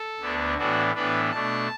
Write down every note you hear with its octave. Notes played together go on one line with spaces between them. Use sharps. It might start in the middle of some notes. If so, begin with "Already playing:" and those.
Already playing: A4
D2 D3 B3 D4
A2 E3 B3 D4 F#4
A2 E3 B3 D4 B4
B2 A3 D4 A5